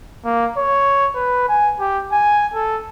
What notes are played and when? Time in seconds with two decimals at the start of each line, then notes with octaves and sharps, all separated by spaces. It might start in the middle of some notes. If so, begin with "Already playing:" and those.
0.25 A#3
0.57 C#5
1.15 B4
1.49 G#5
1.80 G4
2.12 G#5
2.54 A4